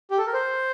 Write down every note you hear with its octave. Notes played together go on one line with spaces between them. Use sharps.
G4
A4
A#4
C5